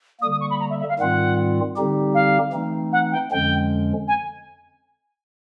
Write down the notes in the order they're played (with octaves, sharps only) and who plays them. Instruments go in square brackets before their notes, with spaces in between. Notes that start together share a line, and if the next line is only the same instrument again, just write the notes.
[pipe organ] D3 G3 A#3 [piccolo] D#6
[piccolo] D#6
C#6
B5
A#5
E5
E5
F5
[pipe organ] G#2 D#3 G3 C4 F4 [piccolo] F#5
[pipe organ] D3 G3 C4 D#4 G4
[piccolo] F5
[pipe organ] E3 A3 C4 D#4
[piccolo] F#5
G5
[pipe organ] F2 D3 F3 G#3 C#4 [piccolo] G5
[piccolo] G#5